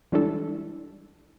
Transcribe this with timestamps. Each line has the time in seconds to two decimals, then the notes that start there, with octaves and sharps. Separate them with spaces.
0.12 E3 G3 G#3 D4 E4 A4